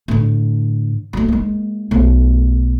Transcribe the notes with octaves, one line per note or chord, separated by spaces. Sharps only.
A2 D3
F#3 A3
G#3 A#3
B1 A3